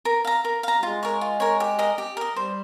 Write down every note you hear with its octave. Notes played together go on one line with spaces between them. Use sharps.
A#4
F5 A#5
A#4
F5 A#5
G3
G#3 F4
A#4 C#5
F4
A#4 C#5
G4
A#4 D#5
G4
A#4 D#5
G3 C5